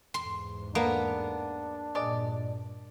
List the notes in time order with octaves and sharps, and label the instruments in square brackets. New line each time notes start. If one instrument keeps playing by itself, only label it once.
[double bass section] E2 G#2 [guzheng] C6
[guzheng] A#3 [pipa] B3 [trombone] D4
[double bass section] G2 A#2 [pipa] G#3 D5